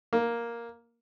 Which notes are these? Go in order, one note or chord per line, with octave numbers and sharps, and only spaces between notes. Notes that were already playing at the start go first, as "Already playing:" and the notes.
A#3